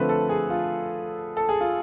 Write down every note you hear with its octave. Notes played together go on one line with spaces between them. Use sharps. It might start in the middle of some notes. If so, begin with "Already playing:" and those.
Already playing: D3 F3 A3 C4 B4
A4
G#4
F4
A4
G#4
F4